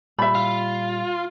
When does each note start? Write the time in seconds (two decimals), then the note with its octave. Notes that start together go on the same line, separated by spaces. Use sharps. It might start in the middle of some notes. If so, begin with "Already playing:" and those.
0.19 A#2 G3 E5 B5
0.35 F4